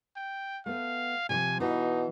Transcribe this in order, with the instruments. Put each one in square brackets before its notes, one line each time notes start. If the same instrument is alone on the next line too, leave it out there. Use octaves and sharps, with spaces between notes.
[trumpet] G5
[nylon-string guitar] A3 B3 [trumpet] F5
[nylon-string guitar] C3 E3 F3 [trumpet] G#5
[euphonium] B2 [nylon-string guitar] E3 [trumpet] D#4